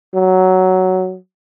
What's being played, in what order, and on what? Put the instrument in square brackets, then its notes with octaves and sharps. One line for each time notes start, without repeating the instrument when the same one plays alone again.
[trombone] F#3